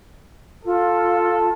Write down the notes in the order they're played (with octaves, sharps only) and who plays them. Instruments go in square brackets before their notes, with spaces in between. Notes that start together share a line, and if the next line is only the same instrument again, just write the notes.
[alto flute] F4 [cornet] A4